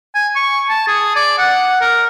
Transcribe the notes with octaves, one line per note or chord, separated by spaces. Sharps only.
G#5
C#6
A5
G#4
D5
F#5
A#4